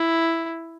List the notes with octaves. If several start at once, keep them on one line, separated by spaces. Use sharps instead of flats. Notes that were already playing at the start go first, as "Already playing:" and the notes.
Already playing: E4